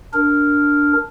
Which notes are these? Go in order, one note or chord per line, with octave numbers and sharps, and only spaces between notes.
D4 A#4